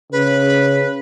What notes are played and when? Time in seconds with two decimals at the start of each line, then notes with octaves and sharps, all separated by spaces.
0.12 C#3 B4